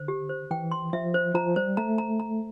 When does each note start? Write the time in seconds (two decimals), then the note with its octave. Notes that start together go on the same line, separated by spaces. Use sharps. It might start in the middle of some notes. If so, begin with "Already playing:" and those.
Already playing: D3 C5
0.08 G4
0.29 C5
0.51 E3 G5
0.71 C6
0.93 F3 E5
1.14 C5
1.35 F3 A#5
1.56 G3 C5
1.77 A3 A#5
1.98 A#5
2.20 A#5